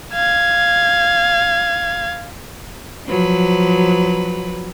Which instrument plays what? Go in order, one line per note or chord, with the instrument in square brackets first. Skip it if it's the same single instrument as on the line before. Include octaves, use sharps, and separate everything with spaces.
[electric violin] F5 G#6
[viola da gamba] F3 F#3 B4